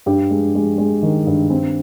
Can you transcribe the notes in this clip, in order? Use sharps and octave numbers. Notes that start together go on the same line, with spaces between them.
G2 G4
G#3
G#3
G#3
D#3
G2
C4